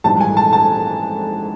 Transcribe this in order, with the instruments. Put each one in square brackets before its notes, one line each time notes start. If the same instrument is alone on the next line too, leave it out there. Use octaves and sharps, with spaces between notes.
[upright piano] A#1 G#2 E3 G3 A5
G#5
A5
A5